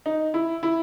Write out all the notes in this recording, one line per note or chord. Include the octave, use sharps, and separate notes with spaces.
D#4
E4
E4